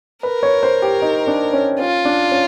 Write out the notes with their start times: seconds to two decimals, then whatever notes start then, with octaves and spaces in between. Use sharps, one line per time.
0.23 A#4 B4
0.43 C#5
0.63 C5
0.82 G4
1.02 D#4
1.27 D4
1.53 C#4
1.79 C#4 F4
2.05 D4
2.32 C#4